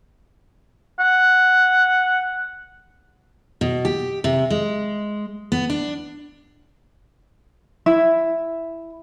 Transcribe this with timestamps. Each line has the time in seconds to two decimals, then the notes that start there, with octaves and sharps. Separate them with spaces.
1.00 F#5
3.61 B2
3.85 G4
4.24 C3
4.50 G#3
5.52 B3
5.70 D4
7.86 E4 E5